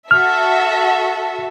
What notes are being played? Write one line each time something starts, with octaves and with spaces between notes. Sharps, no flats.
F#4 A4 E5 F6